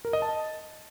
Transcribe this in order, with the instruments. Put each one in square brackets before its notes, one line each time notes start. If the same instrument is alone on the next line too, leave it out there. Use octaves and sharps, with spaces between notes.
[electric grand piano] A#4
D#5
A5